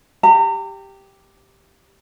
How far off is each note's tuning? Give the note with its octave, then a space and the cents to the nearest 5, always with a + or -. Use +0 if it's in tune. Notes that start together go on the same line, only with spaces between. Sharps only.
G4 +0 A#5 -35